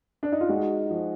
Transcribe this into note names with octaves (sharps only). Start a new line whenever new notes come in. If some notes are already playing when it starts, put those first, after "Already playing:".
D4
D#4
F4
G#3 D#4 F#4
F3